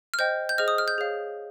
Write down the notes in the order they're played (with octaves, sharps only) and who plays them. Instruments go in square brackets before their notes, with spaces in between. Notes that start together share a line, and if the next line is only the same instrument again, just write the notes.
[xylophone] F6
C5 D#5 G5 G6
G6
G#4 C5 D#5 F6
D#6
F6
G6
G#4 C#5 F5